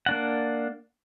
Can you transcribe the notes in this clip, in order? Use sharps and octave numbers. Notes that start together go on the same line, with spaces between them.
A#3 D4 F#5